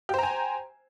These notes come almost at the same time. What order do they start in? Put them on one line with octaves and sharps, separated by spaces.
G4 C5 A#5 G#5